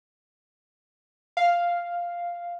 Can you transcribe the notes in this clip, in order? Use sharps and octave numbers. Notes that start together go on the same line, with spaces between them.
F5